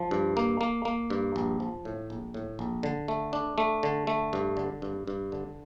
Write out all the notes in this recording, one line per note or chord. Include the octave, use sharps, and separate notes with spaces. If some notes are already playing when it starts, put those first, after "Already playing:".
Already playing: F3
G2
A#3
A#3
A#3
G2
A#1
F3
A2
A#1
A2
A#1
D3
A3
D4
A3
D3
A3
G2
D3
G2
G2
D3